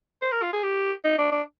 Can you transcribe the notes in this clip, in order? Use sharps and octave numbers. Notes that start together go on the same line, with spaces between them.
C5
A#4
F4
G#4
G4
D#4
D4
D4